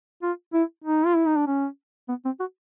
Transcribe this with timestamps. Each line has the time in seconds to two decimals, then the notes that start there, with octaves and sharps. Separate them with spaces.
0.22 F4
0.53 E4
0.84 D#4
1.06 F4
1.16 E4
1.26 D#4
1.37 D4
1.47 C#4
2.09 B3
2.25 C4
2.40 F#4